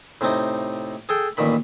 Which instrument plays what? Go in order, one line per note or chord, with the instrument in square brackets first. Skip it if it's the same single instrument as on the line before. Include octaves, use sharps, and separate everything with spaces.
[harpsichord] A2 C3 C4 D#4
G#4 A4 G5
A1 A#2 D#3 B5